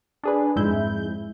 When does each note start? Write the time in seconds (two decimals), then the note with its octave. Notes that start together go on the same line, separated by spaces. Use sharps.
0.23 D4 G#4 B4
0.56 F2 G#2 G#3 E4 G6